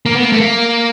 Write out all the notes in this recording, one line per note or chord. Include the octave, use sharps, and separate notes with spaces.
A#3
B3
A#3
A3
A#3